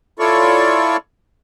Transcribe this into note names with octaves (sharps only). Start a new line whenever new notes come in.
E4 F4 A4 C#5 D5 C#6